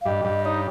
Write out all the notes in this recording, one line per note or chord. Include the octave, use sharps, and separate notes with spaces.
F5
G2 D#5
G2
D#4 C#5